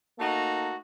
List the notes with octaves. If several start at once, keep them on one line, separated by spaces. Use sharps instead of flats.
A3 A#3 D#4 F#4